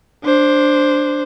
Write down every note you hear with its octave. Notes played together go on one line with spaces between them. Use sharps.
D4 C5